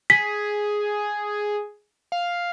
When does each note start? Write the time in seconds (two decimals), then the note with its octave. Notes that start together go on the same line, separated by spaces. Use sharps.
0.10 G#4 B6
2.12 F5